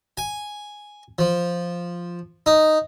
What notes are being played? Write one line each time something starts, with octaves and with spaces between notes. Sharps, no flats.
G#5
F3
D#4